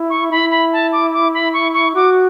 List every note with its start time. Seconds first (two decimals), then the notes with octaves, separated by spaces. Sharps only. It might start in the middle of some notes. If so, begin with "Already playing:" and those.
Already playing: E4
0.10 C#6
0.31 E4 B5
0.51 B5
0.73 A5
0.92 D6
1.14 D6
1.34 B5
1.54 C#6
1.74 C#6
1.95 F#4 D6